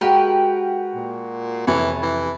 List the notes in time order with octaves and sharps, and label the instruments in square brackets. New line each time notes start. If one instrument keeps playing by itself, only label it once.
[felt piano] G#3 F#4 [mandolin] G4 A#4 B4
[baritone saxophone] A#2
[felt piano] F2 C3 [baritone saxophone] E3 [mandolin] C#5 G#5
[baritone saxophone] E3